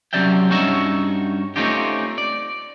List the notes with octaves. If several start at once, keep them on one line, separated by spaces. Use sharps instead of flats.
C3 F#3 C#4 D5 E5 G5
G2 C#4 D#4 F#4 E5
A3 C4 C#4 D#4 F4 G4
D5